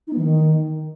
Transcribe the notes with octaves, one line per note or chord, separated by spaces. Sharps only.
D#4
B3
E3
D#3